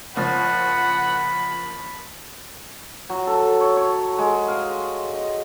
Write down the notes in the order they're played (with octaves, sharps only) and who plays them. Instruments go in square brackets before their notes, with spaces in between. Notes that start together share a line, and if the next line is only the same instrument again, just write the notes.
[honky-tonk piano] F#1 F3 [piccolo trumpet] F#5 [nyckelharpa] B5
[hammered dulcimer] F#3
A4
C#5
C#5
G#3
F5
D#5